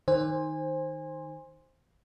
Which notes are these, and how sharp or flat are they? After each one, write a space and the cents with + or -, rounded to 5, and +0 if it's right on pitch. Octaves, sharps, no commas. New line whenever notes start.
D#3 +0 C5 +10 G#5 -20